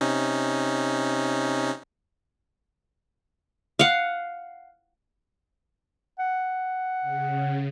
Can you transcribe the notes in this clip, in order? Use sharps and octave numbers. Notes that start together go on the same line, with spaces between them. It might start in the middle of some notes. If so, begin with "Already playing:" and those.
C3 C#4 D#4
F5 F#5
F#5
C#3